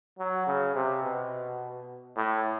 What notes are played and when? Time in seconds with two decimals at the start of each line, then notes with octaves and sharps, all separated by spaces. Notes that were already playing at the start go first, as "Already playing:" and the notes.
0.18 F#3
0.47 C#3
0.75 C3
1.03 B2
2.16 A2